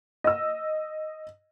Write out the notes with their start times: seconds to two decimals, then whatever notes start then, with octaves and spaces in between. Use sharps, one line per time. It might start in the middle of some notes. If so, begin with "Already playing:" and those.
0.24 D#5 E6